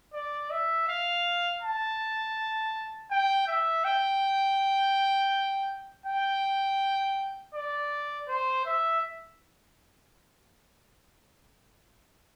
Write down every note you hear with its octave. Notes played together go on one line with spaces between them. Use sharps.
D5
E5
F5
A5
G5
E5
G5
G5
D5
C5
E5